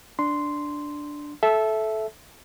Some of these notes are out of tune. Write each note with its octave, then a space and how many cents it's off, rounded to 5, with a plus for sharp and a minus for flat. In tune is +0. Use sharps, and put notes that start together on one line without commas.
D4 +0 C6 -5
A4 -20 E5 +0